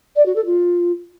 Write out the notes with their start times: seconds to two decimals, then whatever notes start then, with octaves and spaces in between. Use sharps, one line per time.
0.15 D5
0.25 F#4
0.35 A4
0.45 F4